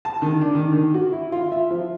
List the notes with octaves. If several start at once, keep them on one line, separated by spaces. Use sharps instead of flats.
A5
D#3
D4
D#3
D#3
F#4
E4
F4
E5
F3